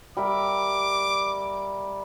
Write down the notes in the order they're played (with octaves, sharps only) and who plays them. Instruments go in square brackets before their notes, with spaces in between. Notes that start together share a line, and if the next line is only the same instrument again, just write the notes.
[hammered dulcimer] G3 A#4 E5 [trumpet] D6